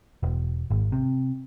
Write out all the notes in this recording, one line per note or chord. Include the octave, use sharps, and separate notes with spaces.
E1
G#1
C3